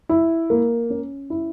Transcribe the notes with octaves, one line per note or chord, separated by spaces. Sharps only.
E4
A#3
C#4
E4